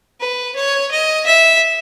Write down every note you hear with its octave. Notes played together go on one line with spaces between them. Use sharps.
B4
C#5
D#5
E5